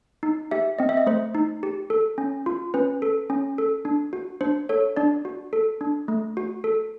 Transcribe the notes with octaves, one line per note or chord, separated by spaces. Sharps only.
D#4
G4 E5
C4 D#5
E5
D#5
A3 C5
D#4
G4
A4
C#4
F4
C#4 B4
A4
C#4
A4
D4
F#4
D4 C5
A4 C#5
D4 D5
F#4
A4
D4
A3
F#4
A4